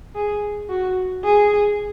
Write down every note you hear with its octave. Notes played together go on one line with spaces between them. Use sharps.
G#4
F#4
G#4